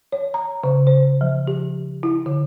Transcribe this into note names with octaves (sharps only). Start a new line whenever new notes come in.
C#5
A#5
C#3
C5
F3
G4
E4
D3